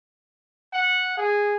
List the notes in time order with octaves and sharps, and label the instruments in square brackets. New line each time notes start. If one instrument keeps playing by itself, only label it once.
[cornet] F#5
G#4